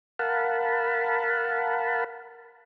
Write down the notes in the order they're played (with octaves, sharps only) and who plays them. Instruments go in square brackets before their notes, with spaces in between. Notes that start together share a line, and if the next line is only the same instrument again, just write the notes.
[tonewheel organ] A#4 F5 F#5 A5 B5